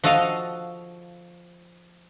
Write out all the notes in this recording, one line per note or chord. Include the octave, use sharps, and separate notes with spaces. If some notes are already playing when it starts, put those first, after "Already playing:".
F3 F#4 A4 D#5 F5